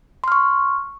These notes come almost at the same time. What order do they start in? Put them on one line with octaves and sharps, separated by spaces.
C6 F6 C#6